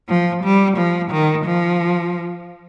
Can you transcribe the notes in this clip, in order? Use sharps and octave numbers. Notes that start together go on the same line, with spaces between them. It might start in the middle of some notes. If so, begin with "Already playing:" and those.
F3
G3
F3
D#3
F3